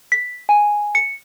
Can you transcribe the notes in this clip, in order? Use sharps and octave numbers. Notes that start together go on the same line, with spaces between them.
B6
G#5
C#7